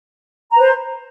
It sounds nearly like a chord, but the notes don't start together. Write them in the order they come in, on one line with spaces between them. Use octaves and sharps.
A#5 B4 C5